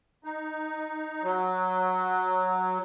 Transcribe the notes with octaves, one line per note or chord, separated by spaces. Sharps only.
D#4
F#3